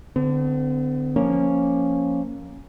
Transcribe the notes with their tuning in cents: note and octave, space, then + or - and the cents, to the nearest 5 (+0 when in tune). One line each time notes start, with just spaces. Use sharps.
D3 +0 C4 -45
F3 +0 A#3 +0 C#4 +0